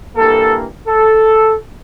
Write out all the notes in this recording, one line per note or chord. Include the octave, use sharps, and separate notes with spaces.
G2 E3 G3 A#3 A4
A4